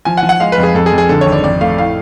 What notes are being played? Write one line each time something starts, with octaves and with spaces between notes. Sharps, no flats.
F3 G#5
F#5
F3
F#5
G#3 F5
B4
F2
G#4
F2 A4
G#4
F2
G#4
D3 A4
C#5
G#1
D5
F2 D5
A3 F5
A2 F5